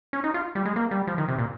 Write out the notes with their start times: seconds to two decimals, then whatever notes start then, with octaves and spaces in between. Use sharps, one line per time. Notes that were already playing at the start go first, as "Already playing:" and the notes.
0.13 C#4
0.24 D#4
0.34 F4
0.55 G3
0.66 G#3
0.76 A#3
0.91 G3
1.07 F3
1.18 D#3
1.28 C3
1.38 A#2